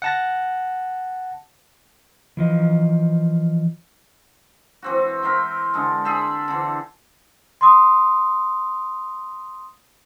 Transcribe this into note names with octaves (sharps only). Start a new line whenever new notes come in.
F#5 A5 A#6
E3 F3 D#5
E3 C4 F#4
A#4 E5 G5 C6
D3 G#3
G#4 A4 E5 G5
D3 E3
C6 D#6